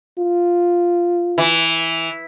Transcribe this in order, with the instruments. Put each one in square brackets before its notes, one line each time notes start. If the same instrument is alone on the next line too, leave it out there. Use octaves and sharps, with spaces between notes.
[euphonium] F4
[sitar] E3